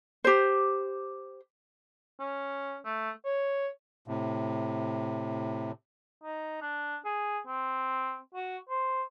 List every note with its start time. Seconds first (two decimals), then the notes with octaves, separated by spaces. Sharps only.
0.24 G4 C5
2.20 C#4
2.85 A3
3.25 C#5
4.08 A2 C3
6.24 D#4
6.62 D4
7.05 G#4
7.47 C4
8.35 F#4
8.69 C5